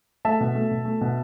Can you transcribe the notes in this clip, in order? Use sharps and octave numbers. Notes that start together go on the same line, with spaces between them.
A3 E5 A5
B2
A3
B2
A3
B2